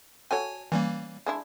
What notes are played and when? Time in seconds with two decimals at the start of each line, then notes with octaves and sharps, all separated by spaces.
0.31 F#4 A4 C#5 G5 G#5
0.72 E3 G3 A#3 C#4
1.26 G#3 D4 E4